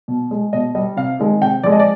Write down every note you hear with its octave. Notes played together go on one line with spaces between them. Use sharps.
B2
G#3
B2 D#5
G3 D#5
C3 F5
D#3 G#3
C3 G5
F3 G#3 D5
D#5
D5